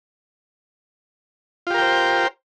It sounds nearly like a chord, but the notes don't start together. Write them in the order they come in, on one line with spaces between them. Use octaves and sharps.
F4 G4 A#4 G5 C5